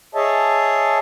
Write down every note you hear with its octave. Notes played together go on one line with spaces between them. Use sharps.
G#4 C#5 D#5 E5 A5